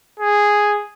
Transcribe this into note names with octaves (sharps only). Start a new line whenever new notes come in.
G#4